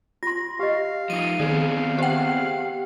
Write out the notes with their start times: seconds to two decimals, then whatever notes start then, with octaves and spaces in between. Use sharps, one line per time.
0.23 F4 C6 A#6
0.59 G4 D#5 F5
1.10 F3 D#4 D#7
1.40 D#3 B3 C4 G#4
1.99 G4 C5 E5 F#5 G5